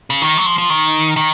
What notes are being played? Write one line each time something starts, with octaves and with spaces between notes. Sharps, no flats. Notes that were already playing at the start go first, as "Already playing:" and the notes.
C#3
D#3
F#3
F3
F3
D#3
D#3